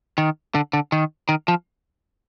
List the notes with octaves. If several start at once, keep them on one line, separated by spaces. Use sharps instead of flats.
D#3
D3
D3
D#3
D#3
F3